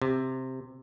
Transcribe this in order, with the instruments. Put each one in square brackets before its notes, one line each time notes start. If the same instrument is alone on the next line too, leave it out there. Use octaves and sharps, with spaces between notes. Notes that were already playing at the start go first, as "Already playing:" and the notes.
[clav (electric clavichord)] C3